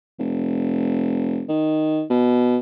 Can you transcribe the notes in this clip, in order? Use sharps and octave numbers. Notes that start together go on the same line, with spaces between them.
F1
D#3
B2